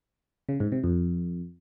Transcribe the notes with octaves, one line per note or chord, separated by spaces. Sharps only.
C#3
G#2
C3
F2